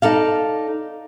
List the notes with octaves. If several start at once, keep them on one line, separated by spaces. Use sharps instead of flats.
D#4 A4 D5 F5